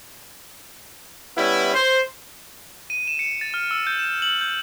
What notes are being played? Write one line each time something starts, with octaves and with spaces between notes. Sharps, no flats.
G3 B3 C#4 E4
C5
D#7
E7
C#7
A6
F6
E6
G6
E7
F#7
G6